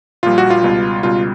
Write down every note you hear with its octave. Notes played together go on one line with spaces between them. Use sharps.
A#1 A#2 G3 F4
F#4
F4
C#2 B2 G3
C#2 B2 G3 F4